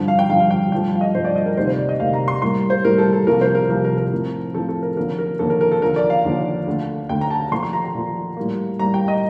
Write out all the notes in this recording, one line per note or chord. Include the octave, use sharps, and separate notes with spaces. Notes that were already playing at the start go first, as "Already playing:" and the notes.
Already playing: G2 D3 F3
F5
G5
G2 D3 F3 F5
F5
G5
G2 F3 A3 G5
F5
D#5
G2 F3 A3 C5
D5
D#5
A#4
D2 C3 D#3 A#3 C5
C5
D5
D#5
D2 C3 D#3 A#3 F5
A#5
C6
A2 G3 A#3 C6
C5
A2 G3 A#3 A#4
A4
A4
C2 C3 F3 A#3 A#4
C5
A#4
C2 C3 F3 A#3 A#4
A#4
A#4
A2 F3 C4
A2 F3 C4 A4
A4
A#4
D#2 D3 F3 A#3 A#4
A#4
D#2 D3 F3 A#3 A4
A#4
A#4
A4
D#2 D3 F3 A#4
D5
F5
D#2 D3 F3
D2 D3 A3
D2 D3 A3 G5
A#5
A5
A#2 F3 A3 C6
C6
A#5
A#5
A#2 F3 A3
A2 G3 A#3
A2 G3 A#3 A#5
G5
D#5